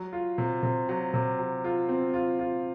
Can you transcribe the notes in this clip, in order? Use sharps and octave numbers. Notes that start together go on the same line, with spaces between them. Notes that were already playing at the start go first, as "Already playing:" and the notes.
Already playing: F#3
F4
C3
C3
F#3
C3
F#3
F4
C4
F4
F4